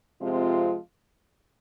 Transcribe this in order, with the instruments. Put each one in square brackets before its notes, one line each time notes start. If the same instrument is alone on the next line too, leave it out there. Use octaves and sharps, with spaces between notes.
[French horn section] C3 F3 G#3 C4 F4